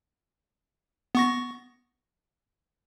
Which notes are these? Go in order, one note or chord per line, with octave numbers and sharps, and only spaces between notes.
B3 C#6 A#6